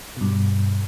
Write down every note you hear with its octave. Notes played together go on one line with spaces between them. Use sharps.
G2 B2